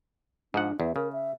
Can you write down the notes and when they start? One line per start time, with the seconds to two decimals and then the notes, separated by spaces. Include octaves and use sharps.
0.54 G#2 F3 D4 F#5
0.80 E2 E5
0.96 C#3 A#4
1.13 E5